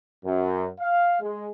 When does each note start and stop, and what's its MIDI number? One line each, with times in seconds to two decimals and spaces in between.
0.25 0.69 42
0.80 1.16 77
1.21 1.51 56